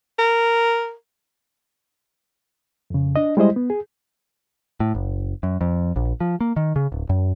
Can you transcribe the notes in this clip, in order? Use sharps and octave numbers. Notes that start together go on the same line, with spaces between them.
A#4
F2 C#3
D4 D#5
G3 G#3 E4 C5 D#5
B3
G#4
A2
F#1
F#2
F2
A#1
F3
A#3
D#3
C#3
D1
F#2